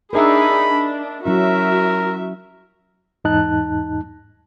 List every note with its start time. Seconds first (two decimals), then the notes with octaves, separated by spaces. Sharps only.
0.13 D4 D#4 G#4 A#4 D#5 E5 B5
0.71 D4
1.26 F#3 C#4 E4 F#4 A#4 E5
3.24 E2 G#2 D#4 A5 F#6